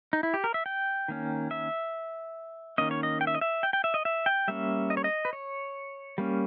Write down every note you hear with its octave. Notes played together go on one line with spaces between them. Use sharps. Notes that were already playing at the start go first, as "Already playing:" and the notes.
D#4
E4
G4
A#4
E5
G5
D#3 A#3 C#4
E5
D#3 A#3 C#4 D#5
C#5
D#5
G5
E5
D#5
E5
G5
G5
E5
D#5
E5
G5
G3 A#3 C#4 E5
D#5
C#5
D#5
B4
C#5
G3 A#3 C#4